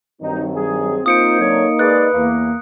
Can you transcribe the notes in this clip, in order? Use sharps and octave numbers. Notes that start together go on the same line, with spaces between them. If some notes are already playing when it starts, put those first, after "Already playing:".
G2 D#3 F#3 C4 D#4
G#4
A#3 D#4 F4 C5 D#6 C#7 D7
D3 F#3 C#5
G#3 G#4 B4 D5 F#6
E2 A#3